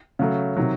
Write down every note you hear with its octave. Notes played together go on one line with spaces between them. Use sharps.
C#3 F#3 A3
C3 D#3 F#3